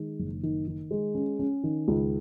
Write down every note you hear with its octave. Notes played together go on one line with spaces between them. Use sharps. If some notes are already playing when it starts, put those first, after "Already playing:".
Already playing: D#3 G#3
F#1
D#3
D#3
G#3
C#4
C#4
D#3
C#2